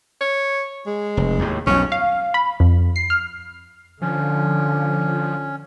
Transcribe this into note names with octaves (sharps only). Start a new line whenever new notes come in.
C#5
G#3
F1
D#2 A2
B1 F2 B2 C#4
F5
B5
F2
C7
F6
D3 F3 C#4